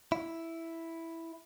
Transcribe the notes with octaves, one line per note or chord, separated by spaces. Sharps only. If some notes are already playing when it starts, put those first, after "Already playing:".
E4